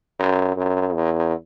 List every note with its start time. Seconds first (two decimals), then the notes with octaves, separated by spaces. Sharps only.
0.19 F#2
0.56 F#2
0.94 E2